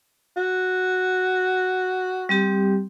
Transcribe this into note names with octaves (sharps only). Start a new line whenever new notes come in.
F#4
G3 C4 G4